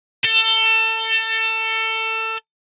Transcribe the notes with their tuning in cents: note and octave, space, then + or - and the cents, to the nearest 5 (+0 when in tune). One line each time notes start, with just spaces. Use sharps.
A4 +25